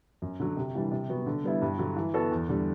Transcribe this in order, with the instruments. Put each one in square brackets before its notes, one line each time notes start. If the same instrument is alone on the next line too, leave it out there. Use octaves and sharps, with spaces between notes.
[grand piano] F#2
D3 F#3
C3
E3 G3 D4
C3
F#3 B3 F#4
D3
G3 B3 E4
G2
D3 F#3
E3
B3 F#4 A4
E2
D3 G3